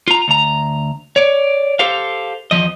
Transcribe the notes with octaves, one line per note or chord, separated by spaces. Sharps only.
F4 A#5
D2 A#5
C#5 D5
G4 A4 C5 F5
E2 B2 F3 D#5